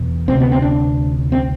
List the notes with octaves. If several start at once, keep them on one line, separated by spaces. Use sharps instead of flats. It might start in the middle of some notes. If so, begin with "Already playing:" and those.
Already playing: E2 B2
D2 C3 C4
B3
C4
D4
C4